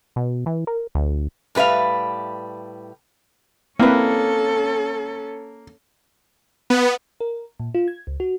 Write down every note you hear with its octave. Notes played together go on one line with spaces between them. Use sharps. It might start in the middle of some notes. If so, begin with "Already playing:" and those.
B2
E3
A#4
D2
A2 G3 B4 E5 F5
A#3 C4 C#4 E4 A4 B4
B3
A#4
A#2
F4
G#6
C#2
F#4